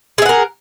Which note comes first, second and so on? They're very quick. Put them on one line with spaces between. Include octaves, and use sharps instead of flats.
G#4 E5 F#5 A#4